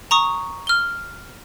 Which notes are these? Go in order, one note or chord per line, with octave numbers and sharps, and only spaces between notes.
A#5 C#6 D#6
F6 G7